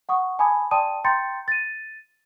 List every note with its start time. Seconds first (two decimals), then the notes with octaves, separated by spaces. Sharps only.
0.09 F#5 C#6 D#6
0.39 G#5 A5 B5 D6 D#6 G#6
0.71 D5 G5 A5 C6 D#6 D#7
1.04 G5 A#5 C6 G6 A6 C#7
1.48 A6 D#7